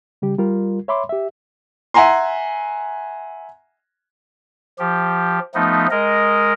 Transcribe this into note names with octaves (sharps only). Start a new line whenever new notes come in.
C#3 G3 G4
G3 F4 A#4
C#5 E5 B5 C6 D6
G4 E5
E5 F#5 G#5 A#5 C6
F3 G4
F3 A3 B3 D#4
G#3 A#4 D#5